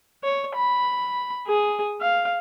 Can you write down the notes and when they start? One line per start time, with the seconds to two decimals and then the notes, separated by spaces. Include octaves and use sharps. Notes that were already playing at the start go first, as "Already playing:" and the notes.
0.24 C#5
0.56 B5
1.47 G#4
2.01 F5